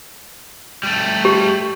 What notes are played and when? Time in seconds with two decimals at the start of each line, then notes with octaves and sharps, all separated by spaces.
0.83 G3 A3
1.25 G4